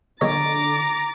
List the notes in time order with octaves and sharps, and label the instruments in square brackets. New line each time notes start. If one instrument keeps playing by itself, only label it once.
[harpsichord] A#1 C#5 D#5 [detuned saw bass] D3 [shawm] A#5 [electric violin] D6 A6